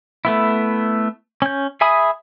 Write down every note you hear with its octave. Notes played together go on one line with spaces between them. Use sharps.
A3 B3 E4
C#4 G6
G#4 E5 G#5 B5 D#6